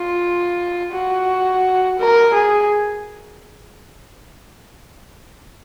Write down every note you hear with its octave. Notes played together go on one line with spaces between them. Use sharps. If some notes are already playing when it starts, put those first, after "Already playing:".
Already playing: F4
F#4
A#4
G#4